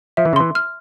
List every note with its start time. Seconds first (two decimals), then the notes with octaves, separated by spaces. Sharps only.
0.17 F3 E5
0.25 E3
0.33 C#3
0.36 E3 C6
0.55 F6